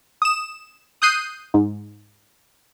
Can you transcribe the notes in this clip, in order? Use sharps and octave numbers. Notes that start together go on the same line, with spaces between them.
D#6 E7
D#6 F#6 G6 C7 D#7
G#2